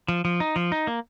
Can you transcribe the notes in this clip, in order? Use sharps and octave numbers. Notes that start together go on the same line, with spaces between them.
F3
F3
D#4
F3
D#4
A#3